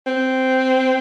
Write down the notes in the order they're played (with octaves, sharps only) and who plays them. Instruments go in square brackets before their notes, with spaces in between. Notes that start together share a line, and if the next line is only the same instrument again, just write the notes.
[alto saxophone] C4